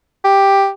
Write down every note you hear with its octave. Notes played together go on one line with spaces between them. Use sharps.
G4